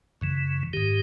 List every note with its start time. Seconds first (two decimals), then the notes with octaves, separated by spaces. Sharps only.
0.21 F#2 C#3 E3
0.73 G#2 D#3 G4